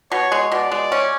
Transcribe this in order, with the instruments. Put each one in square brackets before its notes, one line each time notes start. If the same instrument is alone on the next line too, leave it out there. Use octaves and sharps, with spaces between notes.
[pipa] B2 [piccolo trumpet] C#5
[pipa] G#3
[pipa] B2 [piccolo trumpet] D5
[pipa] G#3
C#4